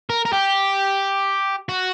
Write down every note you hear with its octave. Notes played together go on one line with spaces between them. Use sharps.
A#4
A#4
G4
F#4